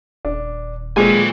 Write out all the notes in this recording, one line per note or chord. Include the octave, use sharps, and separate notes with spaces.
D#1 D4
A#2 G#3 A3 C4 B4 G#5